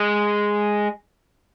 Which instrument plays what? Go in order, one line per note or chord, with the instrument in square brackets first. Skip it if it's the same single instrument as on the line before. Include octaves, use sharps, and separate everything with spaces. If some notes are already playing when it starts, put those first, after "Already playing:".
Already playing: [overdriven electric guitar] G#3